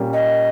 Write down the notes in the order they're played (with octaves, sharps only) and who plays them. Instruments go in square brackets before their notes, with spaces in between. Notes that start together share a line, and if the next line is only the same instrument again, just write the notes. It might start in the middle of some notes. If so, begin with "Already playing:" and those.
Already playing: [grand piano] A#2 G3 A#3 C#4
[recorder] D#5